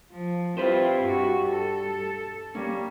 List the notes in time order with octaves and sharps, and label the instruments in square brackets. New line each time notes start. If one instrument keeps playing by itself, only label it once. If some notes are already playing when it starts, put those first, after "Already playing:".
[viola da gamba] F3
[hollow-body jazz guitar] G3 B4 C5 [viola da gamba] C4 E4 F4
[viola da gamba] G2 F#4
A4
[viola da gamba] G3 A#3 [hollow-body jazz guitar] C#4